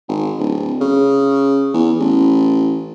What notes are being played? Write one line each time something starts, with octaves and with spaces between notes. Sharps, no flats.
G#1
D1
C#3
E2
A1